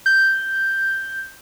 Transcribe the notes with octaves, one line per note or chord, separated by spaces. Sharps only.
G6